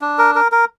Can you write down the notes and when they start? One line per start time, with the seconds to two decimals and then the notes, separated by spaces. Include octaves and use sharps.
0.01 D4
0.18 A#4
0.35 A#4
0.52 A#4